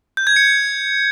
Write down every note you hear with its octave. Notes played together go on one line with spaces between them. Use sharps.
G6
G#6
C#7